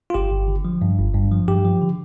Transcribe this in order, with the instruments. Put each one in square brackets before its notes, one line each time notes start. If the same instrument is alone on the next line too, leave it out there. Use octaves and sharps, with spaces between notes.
[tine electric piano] F4
G1 G4
G1
D3
F3
G2
G1
G2
F3
G2 G4
F3
D3